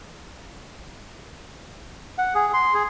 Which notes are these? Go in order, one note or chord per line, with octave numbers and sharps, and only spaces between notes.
F#5
G#4
C6
G#4